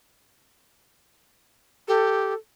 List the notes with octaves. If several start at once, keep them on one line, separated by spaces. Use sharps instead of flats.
G4 A4